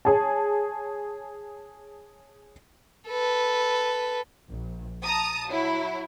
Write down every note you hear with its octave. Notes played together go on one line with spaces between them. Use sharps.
G#4 C#5 A5
A4 B4
A#1
A5 A#5 D#6
F#3 E4